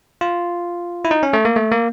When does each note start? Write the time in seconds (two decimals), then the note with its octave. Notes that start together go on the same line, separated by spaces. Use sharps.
0.21 F4
1.05 E4
1.11 D#4
1.23 C#4
1.33 A3
1.45 A#3
1.56 A3
1.72 A#3